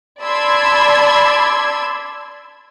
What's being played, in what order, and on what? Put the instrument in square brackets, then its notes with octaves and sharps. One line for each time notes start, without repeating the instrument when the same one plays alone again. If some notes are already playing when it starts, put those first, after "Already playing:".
[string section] D5 A5 B5 C6 E6 G#6